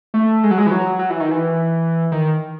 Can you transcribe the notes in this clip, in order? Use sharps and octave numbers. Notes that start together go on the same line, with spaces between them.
A3
G#3
F#3
G#3
E3
F#3
F#3
E3
D#3
E3
D#3